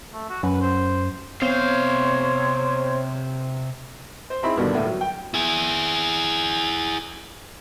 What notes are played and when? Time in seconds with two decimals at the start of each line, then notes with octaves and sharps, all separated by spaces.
0.13 A3
0.30 F#4
0.43 F#2 B4
0.61 C5
1.42 C3 B3 C4 C5 C#5 F5
4.30 C5
4.43 C4 D#4 E4 G#4 B5
4.56 G2 B2 D3 D#3 G3
4.75 D#2 A2
4.87 F#3
5.01 G5
5.34 E4 G#4